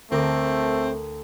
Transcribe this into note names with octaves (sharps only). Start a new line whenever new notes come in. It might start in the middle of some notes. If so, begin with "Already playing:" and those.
D2 A3 C4 A#4 D6